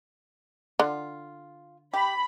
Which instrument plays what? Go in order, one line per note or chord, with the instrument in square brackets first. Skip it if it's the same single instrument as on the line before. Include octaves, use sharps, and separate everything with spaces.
[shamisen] D3 [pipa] F4
[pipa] G4 [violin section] B5